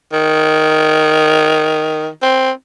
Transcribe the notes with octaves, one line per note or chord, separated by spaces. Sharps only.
D#3
C4